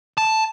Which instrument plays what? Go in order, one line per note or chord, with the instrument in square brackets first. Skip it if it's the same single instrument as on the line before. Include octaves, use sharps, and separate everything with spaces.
[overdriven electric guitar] A5